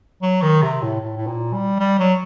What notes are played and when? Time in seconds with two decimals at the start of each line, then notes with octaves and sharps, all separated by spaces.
0.22 F#3
0.42 D#3
0.62 C3
0.82 A2
1.00 A2
1.17 A2
1.27 A#2
1.54 G3
1.80 G3
2.00 F#3